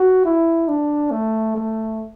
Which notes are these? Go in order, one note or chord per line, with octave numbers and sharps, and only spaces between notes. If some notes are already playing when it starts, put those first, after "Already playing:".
Already playing: F#4
E4
D4
A3
A3